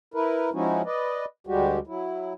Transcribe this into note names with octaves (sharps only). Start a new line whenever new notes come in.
E4 A#4 B4
F3 G#3 C#4 D#4 E4 F#4
B4 D5 D#5
D2 G3 G#3 F#4 G4
F#3 E4